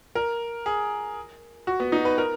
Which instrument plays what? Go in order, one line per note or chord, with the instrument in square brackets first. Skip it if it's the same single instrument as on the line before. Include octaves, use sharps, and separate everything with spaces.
[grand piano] A#4
G#4
F#4
B3
D#4
B4
A#4